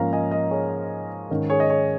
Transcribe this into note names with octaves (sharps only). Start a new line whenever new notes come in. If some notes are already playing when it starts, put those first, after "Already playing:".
Already playing: G#2 F3 A#3 C#4 F5 A#5
D#5 G#5
A#4 D#5
G#4 C#5
G#2 D#3 C#4 A#4
G#4 C#5
D#5
G#4 C#5